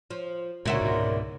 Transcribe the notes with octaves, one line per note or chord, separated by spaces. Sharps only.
F3
C#2 A#2 D3 E4 F#4 A#4 C#5 C6
G#2 B2